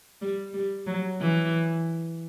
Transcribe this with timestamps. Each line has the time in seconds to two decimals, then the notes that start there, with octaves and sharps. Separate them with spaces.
0.21 G3
0.54 G3
0.87 F#3
1.21 E3